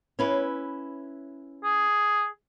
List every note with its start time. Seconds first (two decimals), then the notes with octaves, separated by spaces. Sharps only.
0.19 C#4 E4 B4
1.64 G#4